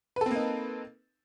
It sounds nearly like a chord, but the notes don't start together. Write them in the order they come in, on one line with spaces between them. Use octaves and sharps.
B4 A4 C4 A#3 D#4